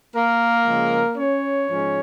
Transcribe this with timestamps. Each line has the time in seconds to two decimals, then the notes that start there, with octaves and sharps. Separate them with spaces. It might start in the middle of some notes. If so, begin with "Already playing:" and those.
0.14 A#3 A#4
0.66 C#3 F3 G#3
1.17 C#4 C#5
1.69 G#2 F3 G#3 C#4